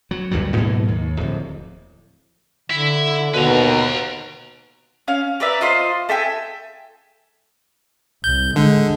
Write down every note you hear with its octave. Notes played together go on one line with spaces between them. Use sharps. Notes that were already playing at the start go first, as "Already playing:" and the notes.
F#3
D2 G2 A#2 F#3
G#2 B2 F#3 A#3
D#2
D1 F2
D3 E4 E5
D#2 B2 B4 A#5
C#4 F5
A#4 B4 D5 E5
F4 C5 D#5 C6
A4 E5 G5 G#5
C2 G6
D3 G#3